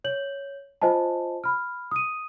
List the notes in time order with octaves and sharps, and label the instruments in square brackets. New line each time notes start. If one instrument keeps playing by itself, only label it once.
[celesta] C#5 G6 F#7
F4 C5 D#5 G#5 A5
B5 F6
D#6 D#7